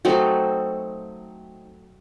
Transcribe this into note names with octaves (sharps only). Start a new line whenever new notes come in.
F#3 A3 C4 D#4